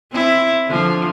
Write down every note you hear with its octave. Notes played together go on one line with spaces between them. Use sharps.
C4 E4
D3 F3